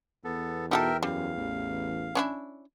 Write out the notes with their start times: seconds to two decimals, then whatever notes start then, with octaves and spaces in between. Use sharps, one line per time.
0.24 E2 B3 A4
0.71 B2 D#4 F#4 A4 A#4 E5 G5
1.03 F#2 G3 F5
1.37 A1
2.15 C#4 D4 E4